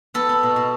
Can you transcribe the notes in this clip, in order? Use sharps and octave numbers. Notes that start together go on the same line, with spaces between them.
B3 A4
B3
B2
B2